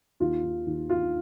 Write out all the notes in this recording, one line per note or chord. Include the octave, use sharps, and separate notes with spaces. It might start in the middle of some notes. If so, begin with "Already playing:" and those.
D#2 F4
D#3
D#2
D#3 F4